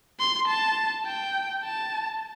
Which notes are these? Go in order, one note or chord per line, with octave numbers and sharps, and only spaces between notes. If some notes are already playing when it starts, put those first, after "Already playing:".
C6
A5
G5
A5